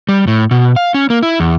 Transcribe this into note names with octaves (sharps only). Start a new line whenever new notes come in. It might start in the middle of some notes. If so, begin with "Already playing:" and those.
G3
A2
B2
F5
C#4
A#3
E4
E2